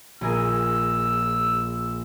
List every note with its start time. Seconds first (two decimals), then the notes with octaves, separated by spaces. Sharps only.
0.21 A#1 G#4 A#4 E6